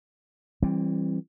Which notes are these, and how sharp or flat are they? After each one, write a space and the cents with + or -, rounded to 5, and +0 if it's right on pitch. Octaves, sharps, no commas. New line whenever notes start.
E3 +10 G3 +0 C4 +30